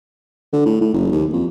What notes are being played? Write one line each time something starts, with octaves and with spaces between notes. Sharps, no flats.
D3
A2
A2
F#1
D#2
F2